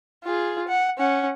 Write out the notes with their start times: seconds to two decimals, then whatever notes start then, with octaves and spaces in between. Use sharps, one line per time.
0.24 F4 G#4
0.68 F#5
0.98 C#4 F#5